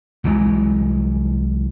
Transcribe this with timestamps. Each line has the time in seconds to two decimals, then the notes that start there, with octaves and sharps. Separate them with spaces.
0.24 C2 E3 F#3 G#3